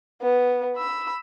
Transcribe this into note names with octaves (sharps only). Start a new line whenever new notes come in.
B3
B5 E6